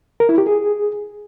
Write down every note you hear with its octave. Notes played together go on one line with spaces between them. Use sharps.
A#4
E4
G4
G#4